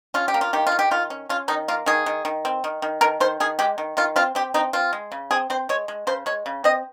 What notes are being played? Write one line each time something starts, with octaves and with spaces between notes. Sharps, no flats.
C#4 F4
G4
A#3
F4
D#3 G4
F4
D#3
G4
D#3 F4
C#4
C#4 F4
D#3 D#4
A#3 F4
D#3 G#4
D#3
D#3
C4
D#3
D#3
D#3 A#4
D#3 C5
D#3 G#4
G#3 G4
D#3
D#3 F4
C4 F4
C4 G4
C4 D#4
C4 F4
G#3
C#3
C4 G#4
C4 C5
G#3 C#5
G#3
C#3 C5
G#3 C#5
C#3
C4 D#5